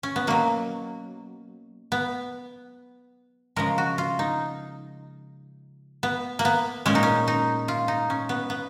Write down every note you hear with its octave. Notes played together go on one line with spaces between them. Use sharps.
C#4
B3
B2 F#3 A#3
B3
C#3 F3 G#3 A#4
F#4
F4
D#4
B3
A#3
B3
A#2 G#3 C#4
D#4
C#4
D#4
F4
D#4
C#4
B3
B3